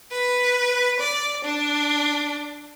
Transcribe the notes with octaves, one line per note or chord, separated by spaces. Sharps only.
B4
D5
D4